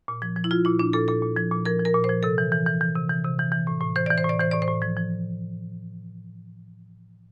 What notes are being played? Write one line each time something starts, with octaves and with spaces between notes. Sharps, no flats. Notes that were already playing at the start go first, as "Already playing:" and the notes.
A#2
F3
F3
E4
F3 F4
A#2 E4
A#2 D4
A#2 A4
A#2 A4
A#2
F3
A#2
F3 A#4
F3
A#4
A#2
F3 C5
C3 A4
E3
E3
E3
E3
C3
E3
C3
E3
E3
A2
A2
E3 C5
E3 D5
C5
A2 D5
E3 C5
A2 D5
C5
A2
F3
F3